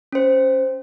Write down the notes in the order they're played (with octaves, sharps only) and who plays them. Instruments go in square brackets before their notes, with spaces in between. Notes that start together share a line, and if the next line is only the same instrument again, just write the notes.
[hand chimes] C#4 C5